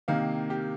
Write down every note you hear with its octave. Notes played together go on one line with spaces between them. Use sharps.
C3 D#3 A#3 F5
G4